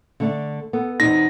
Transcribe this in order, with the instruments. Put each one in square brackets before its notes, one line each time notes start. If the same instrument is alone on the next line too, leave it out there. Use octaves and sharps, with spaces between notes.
[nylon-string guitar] D3 A3 D4
[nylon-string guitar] B3 [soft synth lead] A4
[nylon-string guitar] E2 B2 C4 [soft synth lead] D#4 [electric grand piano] A#6